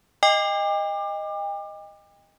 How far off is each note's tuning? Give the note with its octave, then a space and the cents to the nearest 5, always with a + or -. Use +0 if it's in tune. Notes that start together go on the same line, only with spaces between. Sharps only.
D#5 +0 G5 +40 D6 +30